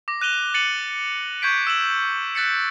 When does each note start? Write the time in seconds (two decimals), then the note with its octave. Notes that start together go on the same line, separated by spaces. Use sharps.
0.08 D6 A#6
0.21 F#6 D#7 F7 G7
0.54 A6 C#7 D#7 F#7
1.42 C#6 G6 G#6 B6 D7
1.67 E6 E7 F#7
2.35 F#6 A6 B6 C#7